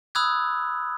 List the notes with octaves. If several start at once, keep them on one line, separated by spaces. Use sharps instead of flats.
B5 D#6 E6 F#6 G#6